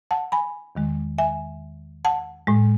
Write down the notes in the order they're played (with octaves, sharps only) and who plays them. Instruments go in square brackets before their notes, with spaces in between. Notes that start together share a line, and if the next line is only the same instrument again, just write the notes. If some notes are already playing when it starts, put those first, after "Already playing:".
[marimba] F#5 A5
G#5 B5
E2 D#3 G#3
E5 G#5
F#5 A5
A2 G#3